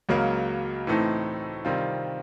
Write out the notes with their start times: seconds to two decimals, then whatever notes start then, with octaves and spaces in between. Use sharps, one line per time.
0.09 C#2 C#3 F#3 A#3
0.87 A2 E3 A3 C4 D#4
1.65 C3 D#3 G3 C4 F4